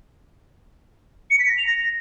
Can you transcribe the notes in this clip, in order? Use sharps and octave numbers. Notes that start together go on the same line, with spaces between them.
C#7
B6
A#6
F7
A#6